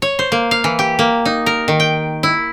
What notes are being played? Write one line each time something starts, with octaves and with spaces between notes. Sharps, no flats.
C#5
C5
A#3
F5
E3
G4
A#3
D#4
A#4
D#3
G5
E4